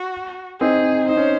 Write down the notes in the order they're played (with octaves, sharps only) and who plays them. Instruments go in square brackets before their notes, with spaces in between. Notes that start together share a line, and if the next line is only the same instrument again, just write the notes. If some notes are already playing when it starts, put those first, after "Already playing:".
Already playing: [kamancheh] F#4
[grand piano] C4 D#4 [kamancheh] G#4
[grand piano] D#4 [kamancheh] C5
[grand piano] C#4